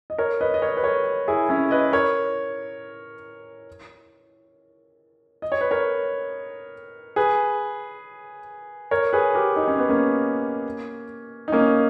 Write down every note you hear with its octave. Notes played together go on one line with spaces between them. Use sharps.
D#5
A#4 C#5
B4 D#5
D#5
A#4 C#5
B4
A#4 C#5
E4 G#4
C#4 E4
B4 D#5
A#4 C#5
D#5
C#5
B4
A#4 C#5
G#4 B4
A#4 C#5
G#4 B4
G4 A#4
D#4
C#4
B3
A#3 C#4
D#4
A#3 C#4